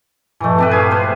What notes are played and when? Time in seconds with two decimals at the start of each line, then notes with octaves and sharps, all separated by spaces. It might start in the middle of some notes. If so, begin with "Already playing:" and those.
0.41 G2 A#2 E3 F3 A3
0.58 A3 C4 G4 B4
0.71 G#4 E5 F5
0.91 C3 A3 C5 F6